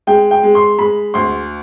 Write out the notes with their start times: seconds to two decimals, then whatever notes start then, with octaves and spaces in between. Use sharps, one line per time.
0.07 G#3 G5
0.31 G5
0.43 G#3
0.55 C6
0.79 G#3 B5
1.14 D2 C6